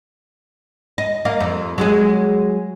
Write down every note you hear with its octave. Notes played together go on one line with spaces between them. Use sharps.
D#5
A#3 D#5 F5
F2
F#3 G#3 G#4